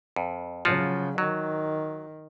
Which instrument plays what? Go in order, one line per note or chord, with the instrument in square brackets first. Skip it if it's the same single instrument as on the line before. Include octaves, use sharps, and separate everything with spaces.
[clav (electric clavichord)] F2
[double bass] C#3 F#3 [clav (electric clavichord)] F3 F4 F#4
[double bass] D#3 [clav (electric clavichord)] F#3